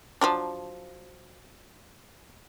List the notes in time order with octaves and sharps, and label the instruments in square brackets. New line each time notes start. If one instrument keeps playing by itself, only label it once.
[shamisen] F3 F#3 D4